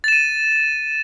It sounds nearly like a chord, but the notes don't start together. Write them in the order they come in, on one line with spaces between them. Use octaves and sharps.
A6 E7 D#7